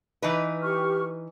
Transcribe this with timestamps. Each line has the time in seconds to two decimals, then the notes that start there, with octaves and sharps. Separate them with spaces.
0.22 E3 D#4 B4
0.63 G4 C#6 F6